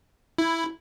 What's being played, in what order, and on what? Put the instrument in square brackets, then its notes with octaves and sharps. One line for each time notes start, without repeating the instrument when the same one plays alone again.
[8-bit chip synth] E4